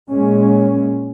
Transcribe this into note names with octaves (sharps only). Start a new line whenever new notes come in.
A#2 G#3 C#4